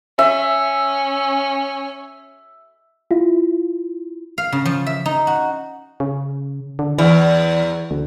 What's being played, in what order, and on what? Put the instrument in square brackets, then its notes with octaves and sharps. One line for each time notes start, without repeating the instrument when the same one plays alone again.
[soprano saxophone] C#4 [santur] E5
[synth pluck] E4 F4
[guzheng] F5
C#3
F3
E5
D#4
F#4
[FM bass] C#3
D3
[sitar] E2 [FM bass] E3
[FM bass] D2